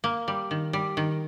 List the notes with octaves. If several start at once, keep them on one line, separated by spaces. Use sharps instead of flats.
A#3
G3
D#3
G3
D#3